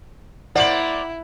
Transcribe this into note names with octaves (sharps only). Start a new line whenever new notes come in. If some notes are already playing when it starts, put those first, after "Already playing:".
A#3 E4 C5 D5 F#5 F#7